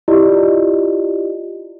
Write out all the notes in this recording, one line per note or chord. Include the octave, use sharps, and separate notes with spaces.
E4 F4 G4 D5 D#5